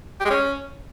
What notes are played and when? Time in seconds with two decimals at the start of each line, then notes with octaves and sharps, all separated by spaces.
0.20 G4
0.25 G#3
0.30 C#4